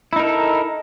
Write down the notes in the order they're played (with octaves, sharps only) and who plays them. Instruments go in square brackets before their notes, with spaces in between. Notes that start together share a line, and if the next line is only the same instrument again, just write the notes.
[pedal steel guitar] E4
D#4
A#4
A4